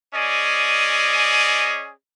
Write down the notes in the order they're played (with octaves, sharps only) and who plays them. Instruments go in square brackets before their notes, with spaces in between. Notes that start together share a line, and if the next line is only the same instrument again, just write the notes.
[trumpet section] C#4 G#4 D5 D#5